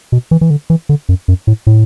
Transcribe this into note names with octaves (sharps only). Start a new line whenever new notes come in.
B2
E3
E3
D3
E3
D3
F#2
F#2
A2
A2